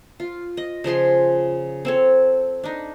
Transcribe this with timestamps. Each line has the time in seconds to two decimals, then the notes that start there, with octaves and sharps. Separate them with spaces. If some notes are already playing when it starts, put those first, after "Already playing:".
0.20 F4
0.57 D#5
0.84 C#3 F3 G#4 C6
1.85 C4 A4 C#5
2.64 D4 D#4